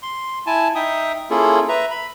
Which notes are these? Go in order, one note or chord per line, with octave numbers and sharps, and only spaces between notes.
C6
E4 G#5 A5
D#4 E5 G5 D#6
A#3 C#4 E4 F4 G#4 A4
B4 E5 A#5
B5